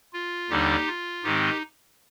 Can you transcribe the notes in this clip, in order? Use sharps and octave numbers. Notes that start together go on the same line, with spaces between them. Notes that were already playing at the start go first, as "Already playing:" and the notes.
F4
D#2 D3 G3 D4 D#4 G4
F4
G#2 D#3 G#3 C4 D#4 G4